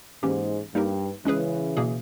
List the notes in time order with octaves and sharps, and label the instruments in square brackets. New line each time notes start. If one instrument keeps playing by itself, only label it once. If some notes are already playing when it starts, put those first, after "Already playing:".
[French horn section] G#2 [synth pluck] E3 A#3 C#4 G4
[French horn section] G2 [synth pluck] G3 A#3 D#4 G4 A#4
[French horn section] C#3 E3 [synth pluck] G#3 C#4 G#4 B4
[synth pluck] B2 A#3 C#4 G#4